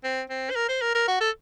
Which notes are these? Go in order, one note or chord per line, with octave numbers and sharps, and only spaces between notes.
C4
C4
C5
A#4
C5
A#4
A#4
F#4
A4